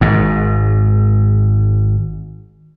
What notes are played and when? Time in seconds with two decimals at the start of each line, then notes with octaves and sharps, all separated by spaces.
0.01 G#1 G#2